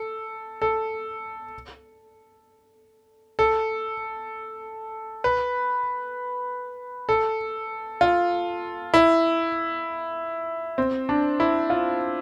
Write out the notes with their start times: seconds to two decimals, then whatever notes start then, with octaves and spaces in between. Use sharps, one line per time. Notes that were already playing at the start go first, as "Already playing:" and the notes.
Already playing: A4
0.62 A4
3.39 A4
5.24 B4
7.09 A4
8.01 F4
8.94 E4
10.78 C4
11.09 D4
11.40 E4
11.70 F4